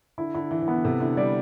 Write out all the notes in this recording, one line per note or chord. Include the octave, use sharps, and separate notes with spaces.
D3 E4
D3 E4
E3 E4
E3
B3
D3
C3 A4
D3 E4
G3 D5